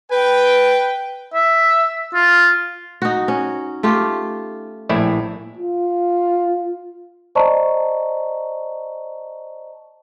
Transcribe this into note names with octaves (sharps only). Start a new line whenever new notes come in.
B4 G5
E5
F4
D#4 F#4
C#4
A3 F4 G4
A#1 A2 E4
F4
C5 D5 D#5 A5 A#5 C#6